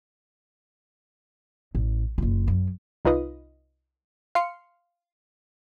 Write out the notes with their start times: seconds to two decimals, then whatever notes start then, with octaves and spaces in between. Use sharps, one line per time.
1.75 A1
2.18 F#1 F4
2.48 F#2
3.05 C2 D#4 F4 B4 D#5
4.35 F5 C6 C7 C#7